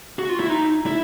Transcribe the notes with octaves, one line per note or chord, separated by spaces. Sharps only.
F#4
F4
E4
D#4
E4